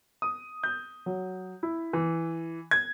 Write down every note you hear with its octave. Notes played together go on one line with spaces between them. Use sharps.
D#6
G6
F#3
E4
E3
G#6